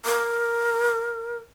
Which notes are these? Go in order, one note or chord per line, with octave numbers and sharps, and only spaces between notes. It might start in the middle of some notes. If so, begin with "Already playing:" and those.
A#4